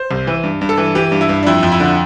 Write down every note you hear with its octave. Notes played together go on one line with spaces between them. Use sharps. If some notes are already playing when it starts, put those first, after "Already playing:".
Already playing: C5
C2
E3
G2
G2
A4
E3
E3 G4
G2
E4
G2
D4
F2 E4
F2
E4
D3